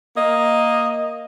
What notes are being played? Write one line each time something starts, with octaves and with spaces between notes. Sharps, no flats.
A#3 D#5